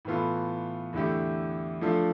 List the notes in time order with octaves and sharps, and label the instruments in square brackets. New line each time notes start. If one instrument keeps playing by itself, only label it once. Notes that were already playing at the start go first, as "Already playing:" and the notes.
[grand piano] A2 E3 B3 F4 A4
E2 D3 A3 E4 G4
F3 A3 D4 F4 A4